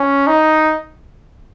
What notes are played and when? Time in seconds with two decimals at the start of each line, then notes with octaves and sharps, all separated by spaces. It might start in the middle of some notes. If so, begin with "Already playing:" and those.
Already playing: C#4
0.27 D#4